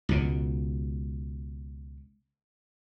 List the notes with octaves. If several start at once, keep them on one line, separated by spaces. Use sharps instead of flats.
C#2 B2